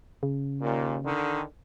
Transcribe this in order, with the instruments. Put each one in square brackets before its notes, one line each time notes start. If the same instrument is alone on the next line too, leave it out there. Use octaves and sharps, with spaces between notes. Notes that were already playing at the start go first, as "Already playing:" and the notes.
[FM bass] C#3
[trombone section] D#2 A#2
D3 D#3